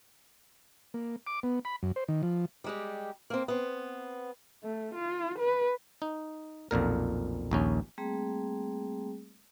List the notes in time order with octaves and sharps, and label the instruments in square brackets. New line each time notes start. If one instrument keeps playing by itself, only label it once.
[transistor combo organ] A#3
D6
B3
B5
F#2
C5
D#3
F3
[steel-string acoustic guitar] G3 G#3 G4
A#3 C4
B3 C4
[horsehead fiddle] A3
F4
B4
[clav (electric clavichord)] D#4
B1 F2 A#2 A#4
A#1 D#2 C#4
[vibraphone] G3 A3 A#3 C4 G#4